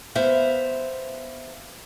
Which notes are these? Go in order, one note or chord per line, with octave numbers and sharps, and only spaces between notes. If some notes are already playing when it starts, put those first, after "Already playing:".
B3 C5 E5 F5